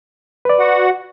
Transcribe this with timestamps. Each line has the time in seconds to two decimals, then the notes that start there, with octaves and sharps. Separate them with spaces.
0.45 B4 D5
0.59 F#4 F#5